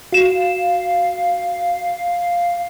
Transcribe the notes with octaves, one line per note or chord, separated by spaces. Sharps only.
F#4 F5 E7